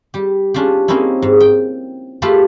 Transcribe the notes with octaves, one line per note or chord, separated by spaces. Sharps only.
G3 G4
C#4 D4 F4 G4
A#3 C4 C#4 D#4 E4
G#2
G5
A3 F4 G4 A4 B4